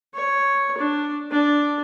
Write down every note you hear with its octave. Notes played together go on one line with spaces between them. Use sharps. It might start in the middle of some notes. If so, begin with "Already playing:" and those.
C#5
D4
D4